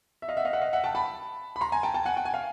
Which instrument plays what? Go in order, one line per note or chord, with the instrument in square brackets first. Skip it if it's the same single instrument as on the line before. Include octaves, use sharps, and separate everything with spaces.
[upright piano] E5
D#5 F5
E5 F#5
D#5 F5
E5 F#5
D#5 F5
E5 F#5
G5 A5
A5 B5
B5
A#5 C6
G#5 A#5
G5 A5
G5 A5
F#5 G#5
G5
G#5
F5 G5